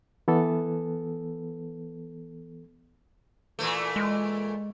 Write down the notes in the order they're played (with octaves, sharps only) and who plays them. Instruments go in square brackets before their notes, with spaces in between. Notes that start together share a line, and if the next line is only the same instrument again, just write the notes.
[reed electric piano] E3 B3 A4
[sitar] A#2 E3 A3
[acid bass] G#3